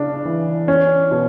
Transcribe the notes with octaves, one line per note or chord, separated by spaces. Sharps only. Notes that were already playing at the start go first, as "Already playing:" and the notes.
Already playing: C#3 D4
E3
C#4
B2